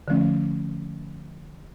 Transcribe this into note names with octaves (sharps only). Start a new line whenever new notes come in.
D3 F3 A3 C#4